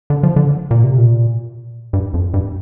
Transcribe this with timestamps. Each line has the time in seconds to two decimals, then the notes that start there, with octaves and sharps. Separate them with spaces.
0.10 D3
0.23 F3
0.36 D3
0.71 A#2
0.84 C3
0.97 A#2
1.93 G2
2.14 F2
2.34 G2